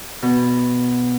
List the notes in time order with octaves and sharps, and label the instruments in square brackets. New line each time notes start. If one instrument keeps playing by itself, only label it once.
[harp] B2